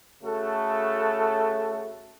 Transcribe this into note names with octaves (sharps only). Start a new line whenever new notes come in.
C#3 A3 F#4 A4